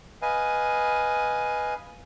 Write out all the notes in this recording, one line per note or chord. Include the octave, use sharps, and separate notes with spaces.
B4 D#5 F5 G#5